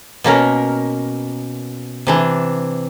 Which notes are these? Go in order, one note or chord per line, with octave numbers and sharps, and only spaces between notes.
B2 A#3 C#4 A#4
C3 E3 D4